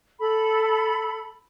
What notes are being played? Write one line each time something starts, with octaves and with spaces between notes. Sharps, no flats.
A4 B5